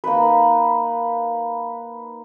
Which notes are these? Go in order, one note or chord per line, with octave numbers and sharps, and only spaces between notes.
A#3 D#4 B4